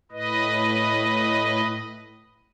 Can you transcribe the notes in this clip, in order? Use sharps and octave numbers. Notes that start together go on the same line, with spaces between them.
A2 B4 D#5